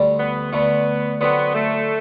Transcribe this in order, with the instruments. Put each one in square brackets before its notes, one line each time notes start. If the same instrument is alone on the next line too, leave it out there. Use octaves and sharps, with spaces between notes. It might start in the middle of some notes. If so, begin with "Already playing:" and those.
Already playing: [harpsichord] D2 D3 G3
[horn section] B3
[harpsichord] D2 D3 A3 [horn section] B3
[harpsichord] D3 F#3 C4 [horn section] B3
[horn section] A3